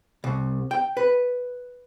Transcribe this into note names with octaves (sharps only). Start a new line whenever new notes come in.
C2
G5
B4